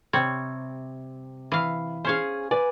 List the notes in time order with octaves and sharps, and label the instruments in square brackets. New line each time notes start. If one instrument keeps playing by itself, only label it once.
[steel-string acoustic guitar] C3 [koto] G3 C4 C#5
[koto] E3 F5
[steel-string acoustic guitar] C#4 G#4 [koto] C5 C#5 F5
[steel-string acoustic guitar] B4 G#5 [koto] D5